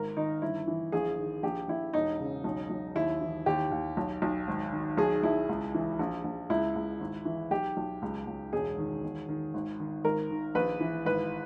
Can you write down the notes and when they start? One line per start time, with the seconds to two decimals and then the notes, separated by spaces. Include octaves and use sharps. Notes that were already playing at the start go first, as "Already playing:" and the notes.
Already playing: G#1 A#4
0.17 D#3 D#4
0.42 G1 E4
0.67 E3
0.92 A#1 G#4
1.19 D#3
1.43 A#1 G4
1.68 A#1 E4
1.93 E1 D#4
2.20 C#3
2.44 B1
2.70 B1
2.95 D#2 E4
3.21 E3
3.46 D#2 G4
3.71 D#2
3.97 B1
4.22 B1
4.48 G#1
4.72 D#3
4.97 B1 G#4
5.23 B1 E4
5.49 C#2
5.74 E3
5.99 A#1
6.24 A#1
6.50 C#2 E4
6.75 C#2
7.01 G#1
7.25 E3
7.51 B1 G4
7.77 B1
8.02 C#2
8.27 C#2
8.53 E1 G#4
8.78 D#3
9.04 E1
9.29 D#3
9.54 G#1
9.80 D#3
10.04 G#1 A#4
10.31 D#3
10.55 A#1 B4
10.80 E3
11.05 G#1 B4